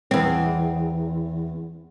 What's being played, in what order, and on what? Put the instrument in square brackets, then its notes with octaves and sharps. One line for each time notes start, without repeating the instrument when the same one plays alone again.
[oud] E2 C4